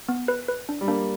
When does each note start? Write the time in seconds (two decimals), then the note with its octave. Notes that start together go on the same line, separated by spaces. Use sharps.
0.09 B3
0.28 B4
0.48 B4
0.69 D4
0.81 G3
0.88 A#3 D4